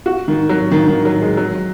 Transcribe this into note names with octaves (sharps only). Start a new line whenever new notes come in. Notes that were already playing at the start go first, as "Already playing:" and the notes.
F#4
D#3
F#3
D#3
D#3
F#3
G#3
F#3